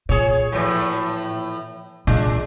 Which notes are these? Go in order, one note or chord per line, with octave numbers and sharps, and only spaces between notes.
A#2 G#4 C#5
A2 E3 F3
A#2 G#3 D4